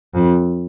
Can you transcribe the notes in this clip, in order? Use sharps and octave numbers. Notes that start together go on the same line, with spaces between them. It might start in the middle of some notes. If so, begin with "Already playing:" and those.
F2